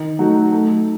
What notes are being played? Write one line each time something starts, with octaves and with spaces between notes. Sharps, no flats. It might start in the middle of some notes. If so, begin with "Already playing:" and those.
Already playing: D#3
F#3 A3 D#4 F#4
A3